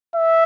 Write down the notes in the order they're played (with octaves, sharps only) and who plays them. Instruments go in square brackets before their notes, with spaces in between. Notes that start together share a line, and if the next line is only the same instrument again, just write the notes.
[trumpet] E5